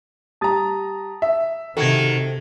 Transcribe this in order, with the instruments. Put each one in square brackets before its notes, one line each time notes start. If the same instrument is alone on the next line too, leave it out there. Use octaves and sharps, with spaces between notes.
[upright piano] G3 A#5 [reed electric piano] A5 D#6 A6
[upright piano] E5
[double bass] C3 [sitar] D#3 F#4 [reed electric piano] A4 G#6